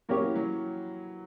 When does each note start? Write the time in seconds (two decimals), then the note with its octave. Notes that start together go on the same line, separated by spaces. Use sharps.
0.09 F#3 A#3 C#4 G4 C#5
0.22 E3
0.35 F#3